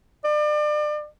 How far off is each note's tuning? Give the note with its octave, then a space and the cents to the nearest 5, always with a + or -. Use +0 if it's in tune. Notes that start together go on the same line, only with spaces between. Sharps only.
D5 +35